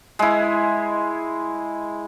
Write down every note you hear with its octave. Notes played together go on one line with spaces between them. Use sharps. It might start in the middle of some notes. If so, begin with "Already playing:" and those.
G#3 E4